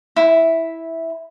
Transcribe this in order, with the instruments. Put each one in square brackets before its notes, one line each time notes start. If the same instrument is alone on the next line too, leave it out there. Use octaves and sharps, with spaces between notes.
[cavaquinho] E4